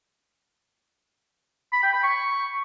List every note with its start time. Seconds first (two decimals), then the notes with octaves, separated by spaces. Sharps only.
1.73 B5
1.83 G5
1.93 B5
2.03 C#6